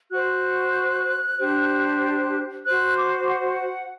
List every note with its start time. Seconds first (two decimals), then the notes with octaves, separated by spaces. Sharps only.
0.11 F#4 C5 F#6
1.39 D4 G4 C5
2.65 F#4 C5 F#6
2.97 D6
3.28 F#5